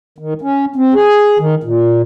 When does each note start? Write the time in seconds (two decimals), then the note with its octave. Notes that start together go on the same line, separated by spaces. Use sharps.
0.18 D#3
0.42 C#4
0.76 C4
0.94 G#4
1.39 D#3
1.64 A#2